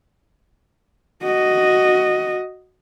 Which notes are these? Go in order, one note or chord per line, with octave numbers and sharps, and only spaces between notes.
F#4 D#5